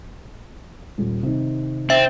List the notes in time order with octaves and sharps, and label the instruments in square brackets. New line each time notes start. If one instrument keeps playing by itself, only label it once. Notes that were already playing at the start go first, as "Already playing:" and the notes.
[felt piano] D#1
C3 D#3
[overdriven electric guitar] C4 [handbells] E5